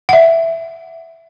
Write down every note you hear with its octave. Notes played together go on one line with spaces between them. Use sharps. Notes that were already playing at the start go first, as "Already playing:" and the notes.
E5 F#5